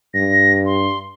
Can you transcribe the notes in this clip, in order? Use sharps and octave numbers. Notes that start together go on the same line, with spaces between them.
G2 A#6
C6